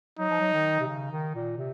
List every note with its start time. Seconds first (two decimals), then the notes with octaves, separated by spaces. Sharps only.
0.19 F#3 D#4
0.30 F3
0.40 F#3
0.54 D#3
0.80 C3
0.88 C#3
1.11 D#3
1.35 A#2
1.58 C3